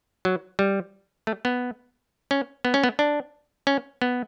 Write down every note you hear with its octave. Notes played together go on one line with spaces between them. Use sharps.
F#3
G3
A3
B3
C#4
B3
C#4
B3
D4
C#4
B3